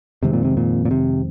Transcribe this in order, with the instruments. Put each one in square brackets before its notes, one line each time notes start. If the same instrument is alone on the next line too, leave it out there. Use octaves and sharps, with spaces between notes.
[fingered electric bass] F2 D#3 G#3 C4 [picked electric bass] C3
[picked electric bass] A#2
C3
A#2
A#2
C3